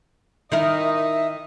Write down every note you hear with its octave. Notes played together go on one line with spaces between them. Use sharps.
D#3 D#4 E4 A#4 D#5 E5
E5